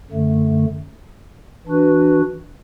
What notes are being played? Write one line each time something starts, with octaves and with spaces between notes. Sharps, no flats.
F#2 D3 A3
E3 D4 F#4 B4